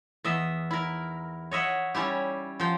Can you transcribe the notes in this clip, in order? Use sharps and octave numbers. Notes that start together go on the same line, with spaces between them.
E2 D#5 E5
E4 A#4
C#5 D#5 E5 F#5
G3 C#4 E4 G4
F3 G5 A#5